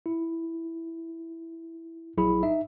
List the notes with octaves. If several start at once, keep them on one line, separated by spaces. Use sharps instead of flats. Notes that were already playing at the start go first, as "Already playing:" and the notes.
E4
A#1 F#3 E4 G#4 B5
D#4 E5